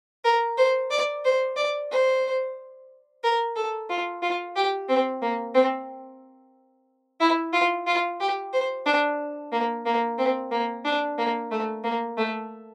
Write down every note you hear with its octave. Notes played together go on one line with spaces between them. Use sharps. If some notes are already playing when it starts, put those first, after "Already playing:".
A#4
C5
D5
C5
D5
C5
A#4
A4
F4
F4
G4
C4
A#3
C4
E4
F4
F4
G4
C5
D4
A#3
A#3
C4
A#3
D4
A#3
A3
A#3
A3